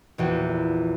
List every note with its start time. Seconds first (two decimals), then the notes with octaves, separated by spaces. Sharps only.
0.18 A#1 E2 F#4 G5